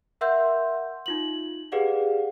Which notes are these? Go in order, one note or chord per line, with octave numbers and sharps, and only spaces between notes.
A#4 E5 F#5 C6 E6 G6
D#4 F4 F#7
G4 G#4 B4 D5 F5 F#5